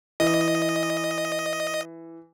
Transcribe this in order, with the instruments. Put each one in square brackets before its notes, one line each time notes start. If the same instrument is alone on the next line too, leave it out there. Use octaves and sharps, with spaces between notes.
[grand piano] E3 [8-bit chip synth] D#5